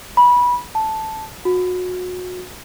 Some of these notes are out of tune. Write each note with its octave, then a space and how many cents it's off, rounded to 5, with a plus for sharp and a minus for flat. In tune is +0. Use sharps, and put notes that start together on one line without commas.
B5 -20
A5 -5
F#4 -30